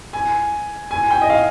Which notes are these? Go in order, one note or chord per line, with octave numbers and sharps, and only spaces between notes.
G#5
G#5
G5
D#5
F5